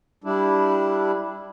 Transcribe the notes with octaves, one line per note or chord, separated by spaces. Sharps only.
G3 D4 E4